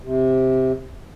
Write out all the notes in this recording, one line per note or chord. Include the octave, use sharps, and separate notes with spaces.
C3